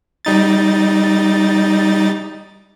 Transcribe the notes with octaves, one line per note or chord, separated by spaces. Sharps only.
G3 D#4 A6